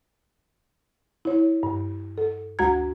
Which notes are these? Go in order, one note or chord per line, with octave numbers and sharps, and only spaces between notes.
E4 C#5
G2
A4
D2 G#3 F#4 A#5 G#6